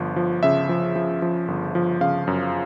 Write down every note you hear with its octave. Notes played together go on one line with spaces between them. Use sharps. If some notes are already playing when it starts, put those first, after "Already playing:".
Already playing: G1 F3
F3
C#3 E5
F3
F3
F3
G1
F3
C#3 F5
F#2